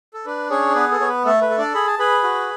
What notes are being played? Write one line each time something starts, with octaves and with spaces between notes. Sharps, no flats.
A4
D4 B4
C#4 G#4 C#5
B3 B4
A4
B3 C#5
B4
A3 A4
B4
A4
D4 D5
G#4 B5
A5
G#4 B4 B5
F#4